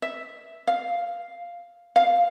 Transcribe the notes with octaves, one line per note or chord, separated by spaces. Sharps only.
E5
F5
F5